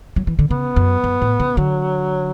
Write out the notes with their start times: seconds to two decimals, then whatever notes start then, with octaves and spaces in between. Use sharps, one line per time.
0.16 F#3
0.27 E3
0.39 D3
0.50 C#3 B3
0.76 F#2
1.04 F#2
1.22 A2
1.40 C#3
1.57 D3 F#3